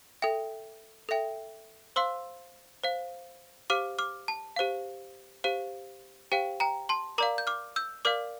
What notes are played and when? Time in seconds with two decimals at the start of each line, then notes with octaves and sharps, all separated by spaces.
0.22 A4 E5 G5
1.09 A4 E5 G5
1.96 C5 F5 C6 E6
2.84 C5 F5
3.70 G4 C5 F5 D6 F6
3.99 D6 F6
4.28 A5
4.56 G4 C5 F5
5.44 G4 C5 F5
6.32 G4 C5 F5 G5
6.60 G5 A#5
6.89 A5 C6
7.18 A#4 D5 F5 A#5 D6
7.38 G6
7.47 D6 F6
7.76 E6 G6
8.05 A#4 D5 F5 D6 F6